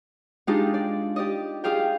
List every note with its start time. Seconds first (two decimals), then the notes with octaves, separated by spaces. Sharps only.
0.47 G#3 D4 D#4 F4 G4 G#4
0.74 D5
1.16 G4 D5 D#5
1.64 F4 G4 G#4 F5 G5